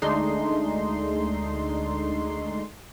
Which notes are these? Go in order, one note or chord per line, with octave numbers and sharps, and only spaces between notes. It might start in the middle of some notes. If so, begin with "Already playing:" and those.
D2 G#3 A3 D4 D#4 C6